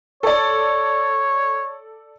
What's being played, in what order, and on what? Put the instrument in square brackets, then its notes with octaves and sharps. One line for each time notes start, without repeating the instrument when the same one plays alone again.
[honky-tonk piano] A4 D5 [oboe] C#5